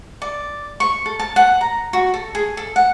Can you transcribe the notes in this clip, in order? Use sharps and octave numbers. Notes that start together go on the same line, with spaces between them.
D5
C#6
A4
A5
F#5
A#5
F#4
A4
G#4
A4
F#5